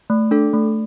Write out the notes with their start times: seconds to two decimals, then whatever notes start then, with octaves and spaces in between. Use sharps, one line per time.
0.10 A3
0.31 D4 A4
0.53 A3